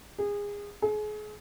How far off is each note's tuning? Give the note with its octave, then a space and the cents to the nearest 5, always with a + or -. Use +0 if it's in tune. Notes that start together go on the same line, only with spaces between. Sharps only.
G#4 -25
G#4 +35